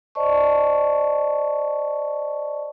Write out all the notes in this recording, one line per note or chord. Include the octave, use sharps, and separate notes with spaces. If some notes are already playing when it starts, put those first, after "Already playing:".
C5 D5 D#5 A5 C#6